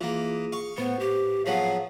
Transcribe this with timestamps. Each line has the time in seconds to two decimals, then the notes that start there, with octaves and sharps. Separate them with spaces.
0.01 E3 A#3 F4 G#4
0.52 F5 C#6
0.78 A2 B3 B4 C5
1.00 G4
1.46 F3 F#3 B3 G#4 F5